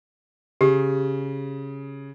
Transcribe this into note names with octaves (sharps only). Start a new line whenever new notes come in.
C#3 G4